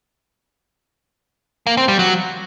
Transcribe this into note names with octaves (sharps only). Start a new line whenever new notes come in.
A#3
C4
G3
F#3